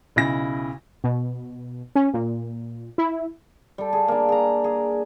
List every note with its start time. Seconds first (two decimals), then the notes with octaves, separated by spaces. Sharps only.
0.16 B1 C#3 E4 A#6
1.04 B2
1.96 C#4
2.14 A#2
2.98 E4
3.78 G3 A4
3.93 G#4 F5
4.08 A#3 D4
4.29 G#4 A#5
4.64 G#4